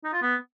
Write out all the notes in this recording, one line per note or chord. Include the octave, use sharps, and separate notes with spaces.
D#4
F4
B3